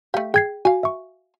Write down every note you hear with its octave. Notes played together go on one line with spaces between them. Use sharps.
A3 G4 F5
G#4 G5 G#6 C7
F#4 F5 G#5
E5 C#6